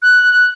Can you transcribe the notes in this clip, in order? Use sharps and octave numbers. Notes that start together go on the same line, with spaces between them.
F#6